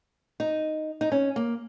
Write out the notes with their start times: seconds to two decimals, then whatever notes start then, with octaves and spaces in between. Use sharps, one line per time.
0.40 D#4
1.01 D#4
1.12 C#4
1.36 A#3